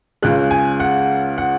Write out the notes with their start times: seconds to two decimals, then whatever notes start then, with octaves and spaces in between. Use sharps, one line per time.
0.23 C#2 C#3 G#3 F#6
0.51 G#5
0.80 F#5
1.38 F#5